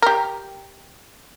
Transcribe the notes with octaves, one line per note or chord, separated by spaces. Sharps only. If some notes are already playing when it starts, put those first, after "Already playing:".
G4 A#4